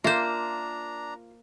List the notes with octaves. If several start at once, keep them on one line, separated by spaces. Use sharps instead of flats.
A#3 D4 F4 C5 E5 A#5